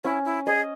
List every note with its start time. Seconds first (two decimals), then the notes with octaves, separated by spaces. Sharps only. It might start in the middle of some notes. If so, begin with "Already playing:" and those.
0.04 C#4 E4
0.25 E4
0.46 G#4 D#5